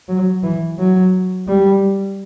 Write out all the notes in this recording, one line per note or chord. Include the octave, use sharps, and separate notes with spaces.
F#3
E3
F#3
G3